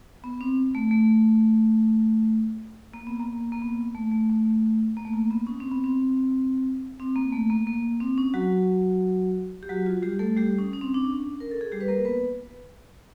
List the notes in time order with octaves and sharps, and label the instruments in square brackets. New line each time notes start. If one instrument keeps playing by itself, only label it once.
[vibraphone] B3
C4
A3
A3
A#3
B3
A#3
A#3
B3
A3
A3
A3
A#3
A3
A#3
B3
C#4
C4
B3
C4
C4
A#3
A3
A#3
A#3
C4
C#4
F#3 F#4
G4
F#3 F#4
F4
G3 G4
A3 A4
G3 G4
C#4
C#4
C4
D4
C#4
A#4
A4
G#4
G3 G4
B4
A#3 A#4
B3 B4